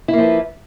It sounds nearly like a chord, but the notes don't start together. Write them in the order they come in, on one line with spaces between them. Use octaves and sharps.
E4 A#3 F3 B4